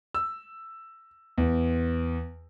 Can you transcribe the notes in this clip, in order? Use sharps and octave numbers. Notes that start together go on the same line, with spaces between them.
E6
E2